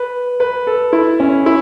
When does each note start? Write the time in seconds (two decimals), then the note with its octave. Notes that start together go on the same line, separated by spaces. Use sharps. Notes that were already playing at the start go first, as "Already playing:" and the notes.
Already playing: B4
0.40 B4
0.67 A4
0.93 E4
1.20 C#4
1.46 E4